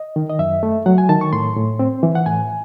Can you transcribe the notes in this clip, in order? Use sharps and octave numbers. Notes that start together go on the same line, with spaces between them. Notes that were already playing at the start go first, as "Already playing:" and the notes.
Already playing: D#5
D#3
D#5
F#2 E5
A3
F#3 F#5
G#5
D#3 A5
C#6
A2 C6
A2
C4
E3
F#5
A2 G#5